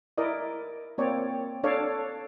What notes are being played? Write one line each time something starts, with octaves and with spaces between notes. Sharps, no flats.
E4 A#4 D5 D#5
A#3 C4 C#5 D5
D4 A4 C#5 D5 F5